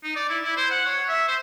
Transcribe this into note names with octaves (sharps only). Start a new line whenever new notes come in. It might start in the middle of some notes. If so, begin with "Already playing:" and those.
D#4
D5
E4
E4
C5
F#5
C#5
E5
C5